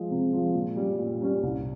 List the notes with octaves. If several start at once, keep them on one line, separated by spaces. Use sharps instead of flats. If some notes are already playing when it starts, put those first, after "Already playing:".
Already playing: F3 G#3
C3
F3 G#3
A#2
G3 C#4 G4
A#2
G3 C#4 G4
C2